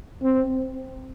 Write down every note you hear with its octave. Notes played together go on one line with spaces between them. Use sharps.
C4